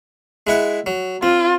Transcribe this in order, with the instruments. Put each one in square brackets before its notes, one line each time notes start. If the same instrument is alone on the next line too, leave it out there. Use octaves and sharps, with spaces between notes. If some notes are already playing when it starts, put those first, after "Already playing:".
[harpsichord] G#3 E4 F#5
F#3
[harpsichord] C4 [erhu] F4